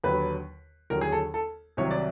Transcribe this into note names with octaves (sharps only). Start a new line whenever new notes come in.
D#2 D3 F#3 B4
D#2 D3 F#3 A#4
G#4
A4
A4
C2 C3 D#3 F#3 C#5
D5